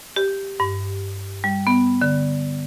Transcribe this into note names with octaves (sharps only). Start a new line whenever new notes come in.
G4
G2
G3
B3
D3